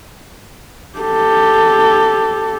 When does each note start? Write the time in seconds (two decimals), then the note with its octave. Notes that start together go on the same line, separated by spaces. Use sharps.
0.99 G4 A4